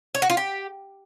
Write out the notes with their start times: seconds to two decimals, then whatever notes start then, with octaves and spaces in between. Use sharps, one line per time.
0.15 C#5
0.22 F#4
0.30 F4
0.37 G4